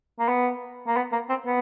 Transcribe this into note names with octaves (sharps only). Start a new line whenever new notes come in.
A#3
B3
A#3
B3
A#3
C4
B3